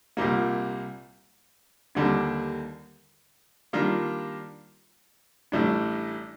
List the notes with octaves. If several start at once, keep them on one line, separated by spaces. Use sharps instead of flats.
C2 A#2 G3 A#3
D#2 D3 G3 A#3 D4
D#3 G3 A#3 D4 F4
A1 A2 G3 D4